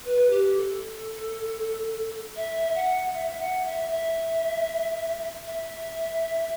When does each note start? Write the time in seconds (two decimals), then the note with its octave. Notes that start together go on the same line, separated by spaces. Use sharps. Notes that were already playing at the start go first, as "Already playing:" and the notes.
0.05 B4
0.30 G4
0.57 A4
2.36 E5
2.75 F#5
3.14 E5
3.31 E5
3.40 F#5
3.65 E5
3.91 E5
5.46 E5